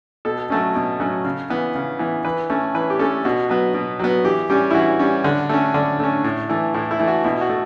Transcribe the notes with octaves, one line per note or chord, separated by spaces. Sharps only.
B2 A4
F#3 A3 C#4
B2
F#3 A3 C#4
C#3
E3 B3
C#3
E3 B3
E3 B4
A3 C#4
E3 B4
G4
A3 C#4 A4
B2 F#4
F#3 B3
B2
F#3 B3
E3 G4
G3 C#4 G4
E4
E3 F#4
G3 C#4
D3
A3 C#4
D3 D4
A3 C#4
A2
E3 A3
A2 E4
E4
E3 A3
F#4
B2 E4
F#4
A3